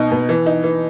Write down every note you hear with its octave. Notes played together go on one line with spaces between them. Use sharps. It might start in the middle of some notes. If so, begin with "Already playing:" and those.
Already playing: B2 D#4
B2
E3
D#4
E3